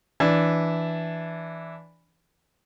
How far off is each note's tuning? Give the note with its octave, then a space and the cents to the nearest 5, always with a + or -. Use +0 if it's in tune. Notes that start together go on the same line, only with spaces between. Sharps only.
E3 +0 D4 -5